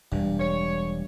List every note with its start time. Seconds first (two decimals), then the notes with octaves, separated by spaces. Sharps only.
0.12 E1 G2
0.40 C#5